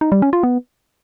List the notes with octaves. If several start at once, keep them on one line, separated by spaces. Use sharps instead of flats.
D#4
G3
C#4
F4
B3